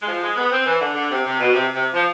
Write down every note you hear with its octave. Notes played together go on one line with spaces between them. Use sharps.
G#3
F3
G#3
B3
C4
E3
D3
D3
C3
C3
B2
C3
C3
F3